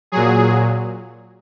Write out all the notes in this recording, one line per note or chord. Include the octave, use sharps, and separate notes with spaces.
A#2 F#3 G#4